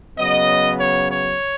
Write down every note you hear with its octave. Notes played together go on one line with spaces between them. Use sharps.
C#3 F#3 B3 D#5
C#5
C#5